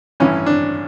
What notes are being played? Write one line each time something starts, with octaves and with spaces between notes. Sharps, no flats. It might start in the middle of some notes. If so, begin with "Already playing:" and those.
A1 G2 E3 C#4
D4